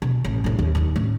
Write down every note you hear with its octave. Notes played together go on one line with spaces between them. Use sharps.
B2
A1
A#1 A2
D#2
D#2 D#4
A1